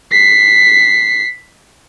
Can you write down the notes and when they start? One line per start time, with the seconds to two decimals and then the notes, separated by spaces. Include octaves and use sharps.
0.11 B6 C7